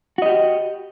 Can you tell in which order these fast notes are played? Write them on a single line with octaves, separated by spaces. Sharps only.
F#4 D#5 G4